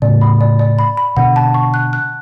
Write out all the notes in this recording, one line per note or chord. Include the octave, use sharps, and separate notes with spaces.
A2 C#3 D5
B5
D5
D5
B5
B5
B2 D3 F#5
A5
C#6
F#6
F#6